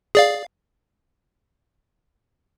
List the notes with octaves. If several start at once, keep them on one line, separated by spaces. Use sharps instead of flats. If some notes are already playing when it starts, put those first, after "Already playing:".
G#4 D5 F5